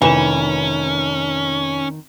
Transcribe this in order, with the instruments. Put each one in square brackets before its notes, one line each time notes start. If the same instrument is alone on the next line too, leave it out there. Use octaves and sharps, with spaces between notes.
[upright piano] F1 E7 [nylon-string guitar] D#3 [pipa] E3 [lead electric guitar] C#4